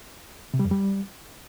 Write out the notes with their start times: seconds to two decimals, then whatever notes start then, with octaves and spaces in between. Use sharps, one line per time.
0.54 C3
0.59 G3
0.65 F2
0.71 G3